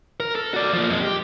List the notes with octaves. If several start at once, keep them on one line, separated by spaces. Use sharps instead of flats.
A#4
A4
F#4 D5
F3 A#3
F2 G#3
G4